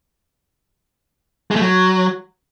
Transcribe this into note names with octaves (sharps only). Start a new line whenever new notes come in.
G#3
A3
F#3